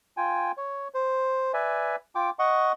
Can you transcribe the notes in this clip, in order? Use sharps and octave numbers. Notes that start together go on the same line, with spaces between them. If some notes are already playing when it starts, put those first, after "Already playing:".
F4 G5 G#5
C#5
C5
B4 D5 E5 G#5
F4 G5 D6
D#5 F#5 C#6